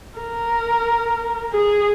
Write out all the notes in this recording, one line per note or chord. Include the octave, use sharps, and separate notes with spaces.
A#4
G#4